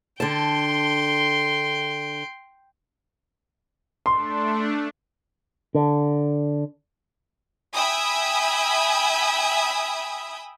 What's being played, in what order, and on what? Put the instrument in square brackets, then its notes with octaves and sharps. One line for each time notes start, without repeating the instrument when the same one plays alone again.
[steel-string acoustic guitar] D3 A5 [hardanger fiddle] G5 C6
[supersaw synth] A3 D4 [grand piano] C6
[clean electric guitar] D3
[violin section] E5 G5 G#5 B5 D#6